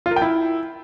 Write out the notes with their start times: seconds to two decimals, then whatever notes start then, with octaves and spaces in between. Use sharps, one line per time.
0.06 F4
0.11 A#4
0.16 G5
0.22 E4